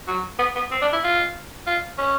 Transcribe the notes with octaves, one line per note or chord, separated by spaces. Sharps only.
F#3
B3
B3
C4
D4
E4
F4
F4
C#4